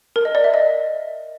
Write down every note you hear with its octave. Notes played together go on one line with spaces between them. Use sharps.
A#4
D#5
D5
E5
D#5